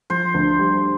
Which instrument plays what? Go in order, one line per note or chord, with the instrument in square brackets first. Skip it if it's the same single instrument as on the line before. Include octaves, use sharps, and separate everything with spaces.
[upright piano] F3 [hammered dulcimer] C5
[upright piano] D2
G3